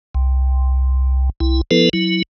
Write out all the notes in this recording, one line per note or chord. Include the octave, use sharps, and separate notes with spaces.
C2
C2 E4
F3 B3 E4 A4 B4
F#3 E4